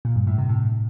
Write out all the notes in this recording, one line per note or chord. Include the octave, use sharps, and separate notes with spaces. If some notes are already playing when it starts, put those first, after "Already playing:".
A#2
G2
A2
C3
A2